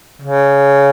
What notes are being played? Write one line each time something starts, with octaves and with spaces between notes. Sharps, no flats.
C#3